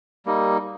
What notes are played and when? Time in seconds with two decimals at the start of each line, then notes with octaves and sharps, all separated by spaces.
0.26 G3 A#3 D#4